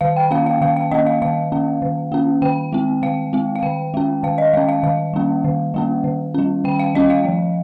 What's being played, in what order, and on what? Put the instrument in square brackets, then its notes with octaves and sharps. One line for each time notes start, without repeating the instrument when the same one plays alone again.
[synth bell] D#3 F5
G5
A#3 C#4 F5
F5
D#3 F5
F5
A#3 C#4 D#5
F5
D#3 F5
A#3 C#4
D#3
A#3 C#4
D#3 G5
G#3 C4
D#3 F5
G#3 C4
F5
D#3 G5
G#3 C#4
D#3 F5
D#5
G#3 C#4 F5
F5
D#3 F5
G3 A#3 C#4
D#3
G3 A#3 C#4
D#3
G3 C#4
D#3 G5
F5
G3 C#4 D#5
F5
F3